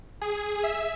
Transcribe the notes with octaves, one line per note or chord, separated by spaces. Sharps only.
G#4
E5